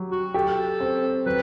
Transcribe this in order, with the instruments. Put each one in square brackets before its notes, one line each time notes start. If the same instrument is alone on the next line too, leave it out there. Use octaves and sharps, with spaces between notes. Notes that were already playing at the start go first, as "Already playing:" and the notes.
Already playing: [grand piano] F#3 G4
[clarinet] F#4
[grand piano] G4 [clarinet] A4
[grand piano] C4
[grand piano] F#3 [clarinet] B4